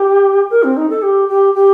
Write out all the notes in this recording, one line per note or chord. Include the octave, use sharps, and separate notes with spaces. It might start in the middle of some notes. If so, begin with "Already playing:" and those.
Already playing: G4
A#4
C4
D#4
A4
G4
G4
G4